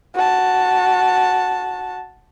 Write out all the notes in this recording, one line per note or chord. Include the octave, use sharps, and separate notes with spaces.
F#4 A5